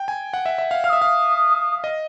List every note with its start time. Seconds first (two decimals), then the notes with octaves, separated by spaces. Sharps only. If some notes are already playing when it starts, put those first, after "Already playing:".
Already playing: G5
0.08 G#5
0.33 F#5
0.46 E5
0.58 E5
0.71 F5
0.84 F5 F6
0.89 E5 D#6
1.02 F5
1.84 D#5